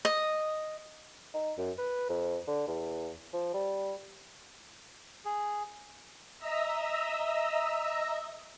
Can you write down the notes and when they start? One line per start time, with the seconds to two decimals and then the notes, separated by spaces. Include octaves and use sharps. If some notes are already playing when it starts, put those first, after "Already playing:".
0.05 D#5
1.34 D#4
1.58 F#2
1.78 B4
2.09 F2
2.48 D3
2.67 E2
3.33 F3
3.54 G3
5.25 G#4
6.39 D#5 E5 A#5 E6